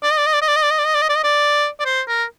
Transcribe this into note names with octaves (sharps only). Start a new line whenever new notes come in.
D5
D#5
D5
D#5
D5
D#5
D5
D#5
D5
D#5
D5
D#5
D5
D#5
D5
D#5
D5
D5
C5
A#4